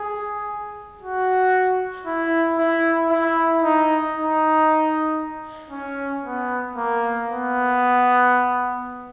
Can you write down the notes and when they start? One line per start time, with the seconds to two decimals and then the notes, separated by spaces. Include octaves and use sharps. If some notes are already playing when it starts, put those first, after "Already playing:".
Already playing: G#4
1.01 F#4
2.06 E4
2.58 E4
3.10 E4
3.62 D#4
4.15 D#4
5.71 C#4
6.23 B3
6.76 A#3
7.28 B3